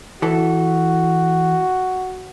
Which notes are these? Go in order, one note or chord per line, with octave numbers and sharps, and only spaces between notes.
E3 F#4 A4